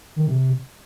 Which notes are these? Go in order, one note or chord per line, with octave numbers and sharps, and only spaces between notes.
D#3
C3